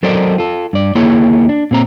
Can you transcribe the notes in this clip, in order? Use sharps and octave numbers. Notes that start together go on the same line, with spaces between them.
F#3 A4 A#4 C5 D5 D#5
F4 A4
G2 D5
D#2 A#3 E4 G#4 C#5 C6
D4
A#2 C4 A#5